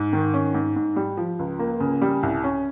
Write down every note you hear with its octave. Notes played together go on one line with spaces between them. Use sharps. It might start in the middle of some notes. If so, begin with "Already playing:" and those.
Already playing: G#2
D#3
C#4
G#2
G#2
G3
F3
C#2
A#3
C#3
G3
C2
C#4